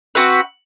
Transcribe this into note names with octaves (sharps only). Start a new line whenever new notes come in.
C4 F#4 B4 E5